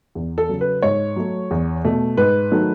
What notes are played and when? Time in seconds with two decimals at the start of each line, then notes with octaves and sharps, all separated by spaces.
0.15 E2
0.38 A4
0.49 C#3 F#3
0.61 B4
0.82 G#2 C#5
1.16 F#3 A3
1.51 E2
1.85 B2 A3
2.17 G#2 B4
2.52 D#3 F#3 A3